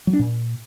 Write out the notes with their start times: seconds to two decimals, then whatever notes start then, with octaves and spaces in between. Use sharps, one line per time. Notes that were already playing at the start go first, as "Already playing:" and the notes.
0.07 F#3
0.13 D4
0.19 A#2